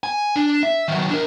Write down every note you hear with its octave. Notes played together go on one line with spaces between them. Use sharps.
G#5
D4
E5
D#3 F#3
D4 A#4